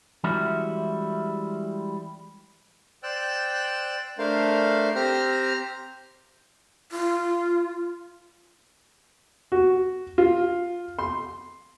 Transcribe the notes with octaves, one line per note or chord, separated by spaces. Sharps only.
E3 G3 G#3 C#4 E4 F#4
C5 D5 G5 E6 F#6
A3 D4 A#4 C5 F5
C4 G4 C5 A#5 F6
F4
F#4
F4
C6